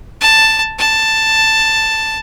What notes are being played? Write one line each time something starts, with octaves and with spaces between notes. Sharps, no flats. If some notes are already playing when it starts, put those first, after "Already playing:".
A5
A5